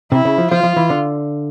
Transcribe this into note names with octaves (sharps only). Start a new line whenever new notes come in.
C3 E4
C#3
F3
F3 F4
F3
E3
D3